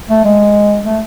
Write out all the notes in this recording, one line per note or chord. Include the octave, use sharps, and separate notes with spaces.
A3
G#3
A3